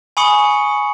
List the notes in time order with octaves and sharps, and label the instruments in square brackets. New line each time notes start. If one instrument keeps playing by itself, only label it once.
[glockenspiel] G#5 B5 C#6 D#6 C#7 F#7